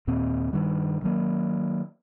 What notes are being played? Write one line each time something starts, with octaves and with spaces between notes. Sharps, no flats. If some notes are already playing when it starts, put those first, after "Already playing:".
D#2 A#2 C4
G2 D#3 G3
D#3 F#3 A#3